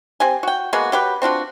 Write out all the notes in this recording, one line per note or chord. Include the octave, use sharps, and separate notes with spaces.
C4 G4 G#5
F#4 G5
G#3 A#3 B3 F#4
F#3 G4 B4
C4 D4 F4 F#4